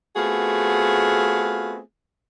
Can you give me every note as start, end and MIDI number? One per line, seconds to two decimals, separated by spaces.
0.16 1.79 57
0.16 1.79 59
0.16 1.79 60
0.16 1.79 65
0.16 1.79 66
0.16 1.79 68